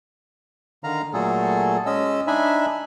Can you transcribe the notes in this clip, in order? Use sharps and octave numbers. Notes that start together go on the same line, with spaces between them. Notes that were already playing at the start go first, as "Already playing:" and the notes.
D3 D#3 F5 A#5
A#2 F#3 A3 G#4 A4
G#3 C#4 D#5 E6
D4 D#4 E5 G#5 B5